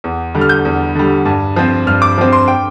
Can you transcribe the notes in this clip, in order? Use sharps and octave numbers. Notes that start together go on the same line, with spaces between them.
E2
D3 G3
F6
G6
E2
D3 G3
G2
F3 C4
G2 F6
D6
F3 C4
C6
G5